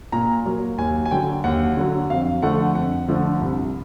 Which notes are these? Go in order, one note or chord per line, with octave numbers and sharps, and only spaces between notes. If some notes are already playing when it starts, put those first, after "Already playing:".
A#2 A#5
F#3 A#3
D#2 G#5
G#5
D3 F#3 G5
D#2 F#5
D3 F#3
F2 F5
D3 F3 A3 F#5
F2 F#5
D3 F3 A3
C2